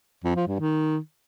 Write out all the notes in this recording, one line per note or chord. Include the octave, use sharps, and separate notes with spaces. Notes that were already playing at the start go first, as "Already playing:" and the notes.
F2
F3
G2
D#3